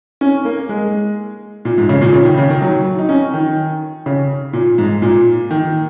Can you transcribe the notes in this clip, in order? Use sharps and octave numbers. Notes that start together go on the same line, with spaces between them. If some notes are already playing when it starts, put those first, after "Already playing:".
C#4
A#3
G#3
A#2
G#2
C#3
A#2
C#3
D#3
C#3
D#3
F#3
D#4
C#4
D#3
C#3
A#2
G#2
A#2
D#3